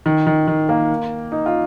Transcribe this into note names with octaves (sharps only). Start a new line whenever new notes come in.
D#3
D#3
D#3
A#3
D#4
F4